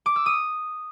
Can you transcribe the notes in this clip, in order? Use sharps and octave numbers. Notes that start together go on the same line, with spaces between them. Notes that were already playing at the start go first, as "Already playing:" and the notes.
D6
E6
D#6